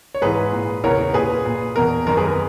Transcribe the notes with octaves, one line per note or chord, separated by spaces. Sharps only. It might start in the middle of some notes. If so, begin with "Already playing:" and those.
C#5
G#2 E3 G#4 B4
A#2
E2 C#3 E3 A#4 C#5
A#2 G#4 B4
A#2
E2 B2 A#4
F#2 D#3 A#4
G#4 B4
A#4